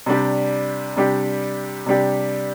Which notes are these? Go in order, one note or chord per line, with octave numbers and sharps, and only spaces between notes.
C3 G3 D4 G4
C3 G3 D4 G4
C3 G3 D4 G4